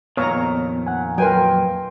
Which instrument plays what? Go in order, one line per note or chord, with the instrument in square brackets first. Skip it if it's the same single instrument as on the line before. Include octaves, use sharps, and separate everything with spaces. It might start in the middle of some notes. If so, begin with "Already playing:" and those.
[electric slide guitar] F2 A#2 D#3 [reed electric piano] B3 [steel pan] C#5 A#5
[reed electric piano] F#5 G#5
[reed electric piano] F#3 [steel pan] A#4 B4 G#5 [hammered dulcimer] G5 C6